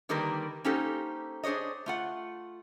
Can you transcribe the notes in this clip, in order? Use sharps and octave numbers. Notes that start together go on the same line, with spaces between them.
D3 D#3 G3 A#3 A#4 B4
A#3 C#4 D#4 G4 A4 C5
D4 G#4 C5 C#5 D#5
A3 F4 F#5